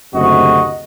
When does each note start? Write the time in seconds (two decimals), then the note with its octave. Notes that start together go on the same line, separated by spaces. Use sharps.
0.14 F#1 D2 C3 F#4 D#5